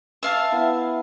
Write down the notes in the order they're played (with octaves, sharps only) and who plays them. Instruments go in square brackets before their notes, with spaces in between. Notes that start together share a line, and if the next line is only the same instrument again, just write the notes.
[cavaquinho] E5 F5 A5
[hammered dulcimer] B3 E4